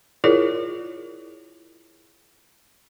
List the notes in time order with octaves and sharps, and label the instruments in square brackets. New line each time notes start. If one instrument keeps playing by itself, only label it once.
[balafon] E4 F4 G#4 A#4 C#5 D5